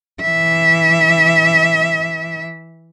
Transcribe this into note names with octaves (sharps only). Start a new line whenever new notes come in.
E3 E5